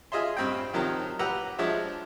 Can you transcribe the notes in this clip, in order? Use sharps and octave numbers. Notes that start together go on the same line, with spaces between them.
F4 G#4 D#5 E5 C6
G2 C4 D#5 G5
C3 D#3 F3 F#3 D#4
G4 B4 F#5 A#5 E6
F3 G#3 D4 C#5 E5